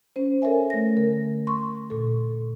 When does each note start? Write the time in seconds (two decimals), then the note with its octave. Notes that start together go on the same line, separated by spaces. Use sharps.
0.16 C#4 C5
0.42 A4 A#4 C#5 E5 G#5
0.70 A3 A#6
0.97 D3 A#4
1.47 C6 C#6
1.90 A#2 A4